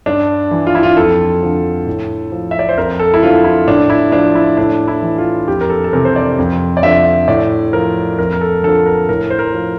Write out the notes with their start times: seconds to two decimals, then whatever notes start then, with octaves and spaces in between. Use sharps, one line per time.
0.06 G2 D4
0.51 E3
0.67 F4
0.75 E4
0.83 F4
0.97 F2 A4
1.42 D3 F3
1.86 A2
2.32 F3
2.51 E5
2.59 D5
2.69 C5
2.77 F2 A#4
2.99 A4
3.14 E4
3.22 D3 F3 F4
3.44 E4
3.67 A2 D4
3.90 E4
4.12 F3 D4
4.35 E4
4.57 A2 D4
4.88 E4
5.02 E3
5.18 F4
5.48 F2 G4
5.61 A#4
5.70 A4
5.84 A4
5.93 C3 E3 A#4
6.05 C5
6.16 D5
6.39 F2
6.77 D5
6.83 D3 F3 E5
7.28 A2 D5
7.73 F3 A#4
8.19 F2 A#4
8.33 A#4
8.41 A4
8.63 D3 F3 A4
8.86 A#4
9.08 A2 A#4
9.30 C5
9.39 A#4
9.54 F3